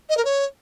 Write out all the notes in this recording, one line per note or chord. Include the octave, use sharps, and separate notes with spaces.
D#5
A#4
C#5